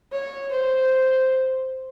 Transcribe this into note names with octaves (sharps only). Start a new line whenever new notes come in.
C#5
C5